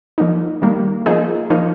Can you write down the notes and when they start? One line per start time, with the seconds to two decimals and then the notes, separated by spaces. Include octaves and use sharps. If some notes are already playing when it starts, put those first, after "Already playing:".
0.18 F3 A#3 D#4
0.62 D#3 G3 A#3
1.06 F3 A#3 D#4 G#4
1.50 F3 A#3 D#4